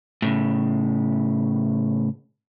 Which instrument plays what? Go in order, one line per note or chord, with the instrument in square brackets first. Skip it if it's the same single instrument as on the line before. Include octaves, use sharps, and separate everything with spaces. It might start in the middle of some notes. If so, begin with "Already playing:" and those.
[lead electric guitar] A2 C#3